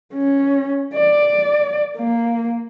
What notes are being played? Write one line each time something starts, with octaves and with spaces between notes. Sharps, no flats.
C#4
D5
A#3